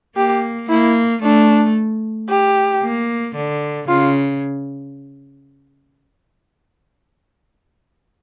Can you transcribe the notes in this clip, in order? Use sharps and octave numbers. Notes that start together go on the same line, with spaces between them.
A#3 G4
A#3 E4
A3 D4
G4
A#3
D3
C#3 F4